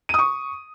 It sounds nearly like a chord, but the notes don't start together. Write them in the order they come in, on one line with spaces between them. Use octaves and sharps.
D#7 D#6 C#6